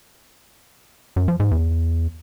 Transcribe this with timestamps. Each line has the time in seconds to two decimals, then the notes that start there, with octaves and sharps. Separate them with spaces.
1.16 F#2
1.28 F3
1.40 G#2
1.51 E2